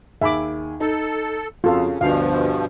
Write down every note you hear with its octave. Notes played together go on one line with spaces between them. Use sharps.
D#2 G#4 E5 G#5 B5 D6
D#4 A4
F2 C#3 F4 F#4 A4 F5
D2 G2 B2 F3 D4 F5